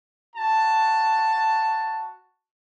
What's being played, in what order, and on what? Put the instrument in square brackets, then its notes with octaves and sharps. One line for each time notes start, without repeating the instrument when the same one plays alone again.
[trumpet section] F#4 A5